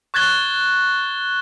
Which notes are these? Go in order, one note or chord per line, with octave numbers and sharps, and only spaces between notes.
C#6 F#6 G#6 A6 G7